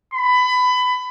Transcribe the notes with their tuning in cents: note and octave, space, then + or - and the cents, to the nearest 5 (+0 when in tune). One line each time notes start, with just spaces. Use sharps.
B5 +20